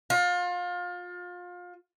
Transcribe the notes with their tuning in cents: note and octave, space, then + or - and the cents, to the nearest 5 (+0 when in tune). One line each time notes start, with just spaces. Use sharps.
F4 +30